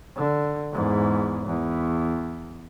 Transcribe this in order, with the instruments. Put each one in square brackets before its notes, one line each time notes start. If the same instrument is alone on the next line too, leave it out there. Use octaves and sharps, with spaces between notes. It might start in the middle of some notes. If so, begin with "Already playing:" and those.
[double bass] D3
E2 G#2
E2